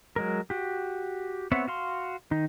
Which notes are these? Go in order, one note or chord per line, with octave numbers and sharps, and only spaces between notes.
F#3 G#3 A#4
F#4 G4
B3 C4 C#5 E5 F#5
F#4 F5 C6
D#3 D#4